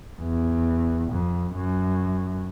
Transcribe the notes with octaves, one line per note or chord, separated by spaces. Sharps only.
E2
F2
F#2